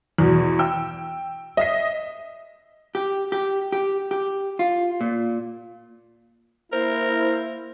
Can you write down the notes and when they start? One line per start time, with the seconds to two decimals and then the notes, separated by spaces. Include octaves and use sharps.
0.18 E2 B2
0.59 G5 E6
1.57 D#5 E5 B6
2.95 G4
3.32 G4
3.72 G4
4.11 G4
4.59 F4
5.01 A#2
6.72 A#3 E4 A#4 C5